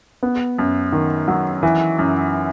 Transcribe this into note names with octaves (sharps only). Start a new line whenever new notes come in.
B3
F#2
D#3
F#3
E3
F#2